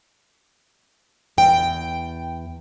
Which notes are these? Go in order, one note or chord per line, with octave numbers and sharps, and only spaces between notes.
E2 G5